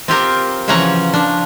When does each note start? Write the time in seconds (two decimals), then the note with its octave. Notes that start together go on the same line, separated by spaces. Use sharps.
0.08 C4 F4 G4 A#4
0.68 C#3 E3 F3 C#4 F#5 A#5
1.13 F3 D4